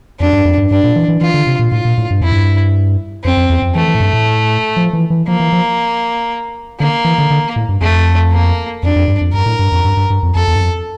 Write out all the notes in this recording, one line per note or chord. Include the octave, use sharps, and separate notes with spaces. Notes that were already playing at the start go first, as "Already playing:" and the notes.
F2 D4
G2
F2
G2
G2 D4
A#2
E3
E3
E3 F4
D3
C3
A#2
A2 F4
A#2
A2
G2
F2 E4
G2
F2 C4
F2
E2
F2
E3 A3
E3
A2
G2
A2
F3
E3
E3
F3 A#3
E3
F3
D3 A#3
E3
D3
D3
A2
G2
F2 A3
A#3
F2 D4
F2
G2
F2
G2 A#4
A2
G2
F2
G2
G2
G2
F2
F2 A4
E2
G2
F2